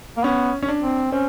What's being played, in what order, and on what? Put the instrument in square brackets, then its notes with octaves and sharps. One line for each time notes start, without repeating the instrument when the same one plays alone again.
[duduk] A#3
[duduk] B3 [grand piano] C#4
[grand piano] C#4
D4
[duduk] C4
[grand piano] C4 [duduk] C#4